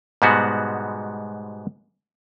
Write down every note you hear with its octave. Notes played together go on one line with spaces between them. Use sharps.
G#2 B2 G3 G#3 B3 F#4